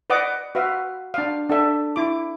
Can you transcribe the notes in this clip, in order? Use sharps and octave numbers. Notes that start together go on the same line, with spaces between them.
B4 D5 D#5 F#5 D6
F#4 B4 E5 F5
D4 F5
D4 A4 E5
E4 D6